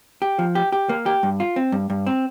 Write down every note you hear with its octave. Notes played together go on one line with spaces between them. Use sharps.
G4
F3
G4
G4
A#3
G4
G2
F4
C4
G2
G2
C4